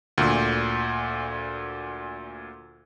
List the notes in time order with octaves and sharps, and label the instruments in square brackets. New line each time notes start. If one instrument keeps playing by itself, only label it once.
[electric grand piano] D2 A#2